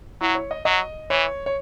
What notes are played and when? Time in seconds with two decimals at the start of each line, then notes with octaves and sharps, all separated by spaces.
0.21 F#3 E4
0.35 C#5
0.51 D#5
0.65 F#3 D#5
1.10 E3 C#5
1.46 C#5